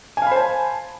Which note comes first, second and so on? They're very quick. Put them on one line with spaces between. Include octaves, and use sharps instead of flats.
G#5 F5 B5 C5 A5